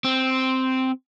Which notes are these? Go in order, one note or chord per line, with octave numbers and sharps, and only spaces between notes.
C4